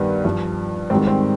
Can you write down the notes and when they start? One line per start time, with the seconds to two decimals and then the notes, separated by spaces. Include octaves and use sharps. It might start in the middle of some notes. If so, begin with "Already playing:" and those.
Already playing: G2 D#3 G3 B3
0.25 G2 F3
0.90 G#2 D#3 G3 C4
1.07 C4